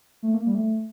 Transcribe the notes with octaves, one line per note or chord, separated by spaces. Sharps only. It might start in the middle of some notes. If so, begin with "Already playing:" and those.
A3
A#3
G3
A3